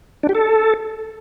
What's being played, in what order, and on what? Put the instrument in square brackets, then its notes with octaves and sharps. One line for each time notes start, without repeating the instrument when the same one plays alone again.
[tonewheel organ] D4
G4
A4